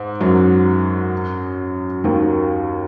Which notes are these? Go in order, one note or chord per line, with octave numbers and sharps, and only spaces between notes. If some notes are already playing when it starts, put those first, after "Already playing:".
Already playing: G#2
F#2 F#3
D#2 D#3